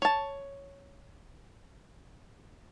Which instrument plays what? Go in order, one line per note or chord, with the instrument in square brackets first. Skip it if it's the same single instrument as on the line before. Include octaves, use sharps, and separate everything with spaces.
[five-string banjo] C#5 A5